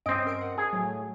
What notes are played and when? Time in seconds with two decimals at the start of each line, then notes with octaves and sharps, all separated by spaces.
0.06 G2 C4 C#4 D#5 D7
0.27 A#4 C7 D7
0.41 F#5
0.58 G#4
0.72 A2 F#3 A3